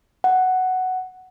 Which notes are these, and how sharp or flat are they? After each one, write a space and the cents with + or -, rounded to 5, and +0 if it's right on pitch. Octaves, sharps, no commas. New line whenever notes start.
F#5 +5